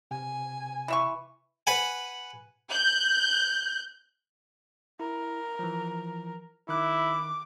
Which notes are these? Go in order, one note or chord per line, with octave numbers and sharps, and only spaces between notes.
C3 G#5
E3 E5 C#6
B4 F#5 G#5
F#6 G6
E4 A#4
E3 F3
D#3 E4 D6 F#6